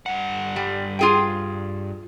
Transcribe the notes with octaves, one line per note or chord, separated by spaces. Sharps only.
G2 F#5
G3
F4 G#4 G5